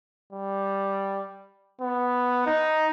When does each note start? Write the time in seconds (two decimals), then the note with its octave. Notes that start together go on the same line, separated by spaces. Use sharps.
0.33 G3
1.81 B3
2.46 D#4